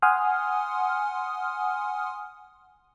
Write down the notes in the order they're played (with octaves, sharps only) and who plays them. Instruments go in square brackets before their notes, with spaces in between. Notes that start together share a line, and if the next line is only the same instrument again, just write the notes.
[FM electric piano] F#5 G#5 C6 D#6 F6